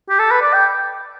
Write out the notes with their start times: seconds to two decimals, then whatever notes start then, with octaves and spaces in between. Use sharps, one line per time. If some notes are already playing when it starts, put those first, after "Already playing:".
0.09 G4
0.19 A4
0.31 B4
0.42 D5
0.53 G5